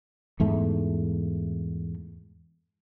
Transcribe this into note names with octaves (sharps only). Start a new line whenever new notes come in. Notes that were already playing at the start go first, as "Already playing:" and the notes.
E2 G#2 A3